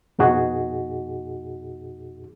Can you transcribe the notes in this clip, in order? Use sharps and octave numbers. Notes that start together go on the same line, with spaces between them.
F2 B2 D#4 F#4 G#4